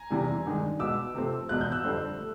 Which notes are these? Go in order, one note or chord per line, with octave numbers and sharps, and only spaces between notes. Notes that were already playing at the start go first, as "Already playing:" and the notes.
Already playing: G#5 A#5
E2 C3 E3 G3
G2 D#3 G#3
B2 G#3 B3 D6 E6
C3 F3 A3 C4
E2 B2 G#3 F#6
G6
E6 F#6
F2 D3 G3 C4
A3